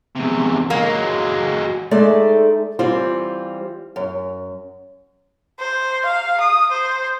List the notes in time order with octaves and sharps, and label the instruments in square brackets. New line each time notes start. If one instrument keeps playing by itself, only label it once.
[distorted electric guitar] E2 C3
[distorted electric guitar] F#3 G#3 [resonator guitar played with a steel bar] A#3
[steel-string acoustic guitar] G#3 A3 D#4 A4 D5 E5
E3 G3 C4 F4 C5
F#2
[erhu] C5
F5
D#6
C5